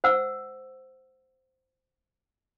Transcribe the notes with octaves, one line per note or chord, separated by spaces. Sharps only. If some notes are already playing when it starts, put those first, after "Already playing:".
C5 F#5 E6